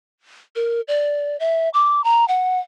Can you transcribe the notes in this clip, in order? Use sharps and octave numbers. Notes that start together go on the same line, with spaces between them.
A#4
D5
E5
D6
A#5
F#5